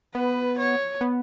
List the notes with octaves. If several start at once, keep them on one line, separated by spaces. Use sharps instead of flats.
B3 B4
C#5
B3